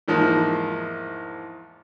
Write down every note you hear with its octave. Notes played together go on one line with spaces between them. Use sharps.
E2 G#2 F3 A#3 D#4 D#6